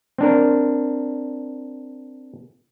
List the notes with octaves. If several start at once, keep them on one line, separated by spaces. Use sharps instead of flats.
C4 D4 A#4